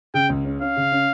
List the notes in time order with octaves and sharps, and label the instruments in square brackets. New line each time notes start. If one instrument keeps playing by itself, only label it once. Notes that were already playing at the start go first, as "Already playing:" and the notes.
[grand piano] C#3 [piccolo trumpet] G5
[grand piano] C#2
C#4
[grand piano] C#4 [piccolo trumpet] F5
[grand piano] C#3
C#4